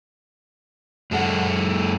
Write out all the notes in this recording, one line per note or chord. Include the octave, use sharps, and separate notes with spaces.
F#2 G#3 A4 F#5